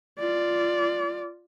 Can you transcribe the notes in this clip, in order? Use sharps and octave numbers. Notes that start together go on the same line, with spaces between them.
F4 D5